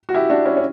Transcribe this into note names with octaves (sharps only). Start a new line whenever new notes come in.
F#4
E4 G4
D4 F#4
C#4 E4
C#4